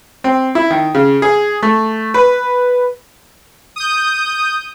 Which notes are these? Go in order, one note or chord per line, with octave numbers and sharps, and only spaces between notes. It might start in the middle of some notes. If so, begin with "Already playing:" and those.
C4
E4
D#3
C#3
G#4
A3
B4
D#6 G6